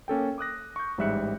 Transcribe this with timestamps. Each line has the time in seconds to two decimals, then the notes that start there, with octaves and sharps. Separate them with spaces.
0.08 A#3 C#4 A4 G5
0.38 D6 D#6 F#6 A#6
0.76 C#6 G6
0.98 A1 G#2 G3 E5 F#6 C#7